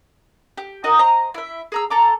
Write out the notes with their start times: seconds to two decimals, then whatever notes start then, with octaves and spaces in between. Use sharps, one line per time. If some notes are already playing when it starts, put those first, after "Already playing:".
0.57 G4
0.84 D#4 F#4 A#4 D#5
0.99 C5 D#5 A#5
1.34 E4 E5
1.72 G#4 A#5 E6
1.90 A4 A#5 D6